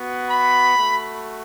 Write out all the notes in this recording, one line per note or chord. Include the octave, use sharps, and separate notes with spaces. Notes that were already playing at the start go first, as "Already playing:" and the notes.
Already playing: B3 F#4
B5
A3 F#4